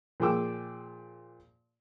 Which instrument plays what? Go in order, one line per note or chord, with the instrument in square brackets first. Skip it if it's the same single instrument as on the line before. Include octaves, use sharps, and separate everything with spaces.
[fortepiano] A#2 F3 G#4 G5 D6 E6